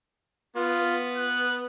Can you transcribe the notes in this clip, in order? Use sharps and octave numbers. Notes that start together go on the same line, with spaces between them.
B3 F4
F#6